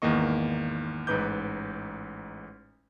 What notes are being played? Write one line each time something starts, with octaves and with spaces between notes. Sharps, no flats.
G#1 E2 D#3 A#3 D#5 C#6
A1 G#2 D#4 B4 D6 G6